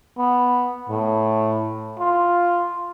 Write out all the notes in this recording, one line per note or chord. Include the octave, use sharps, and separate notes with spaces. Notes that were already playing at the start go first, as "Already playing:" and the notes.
B3
A2
F4